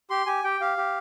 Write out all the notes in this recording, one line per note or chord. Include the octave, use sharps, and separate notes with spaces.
G4 C6
G4 G#5
G4 G5
G4 F5
G4